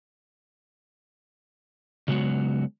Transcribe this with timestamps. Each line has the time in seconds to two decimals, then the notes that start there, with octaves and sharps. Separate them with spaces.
2.08 C#3 F#3 G#3 B3 F#4